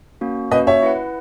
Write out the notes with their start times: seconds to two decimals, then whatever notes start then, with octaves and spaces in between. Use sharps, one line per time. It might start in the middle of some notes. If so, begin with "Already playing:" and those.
0.21 A#3 C#4 F#4
0.51 A#3 C#4 F#4 B4 D#5
0.67 C#5 E5
0.83 E4 B4 F#5